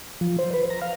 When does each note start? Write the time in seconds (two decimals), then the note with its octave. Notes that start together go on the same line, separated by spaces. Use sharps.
0.21 F3
0.38 C5
0.53 B4
0.70 A#5
0.82 F5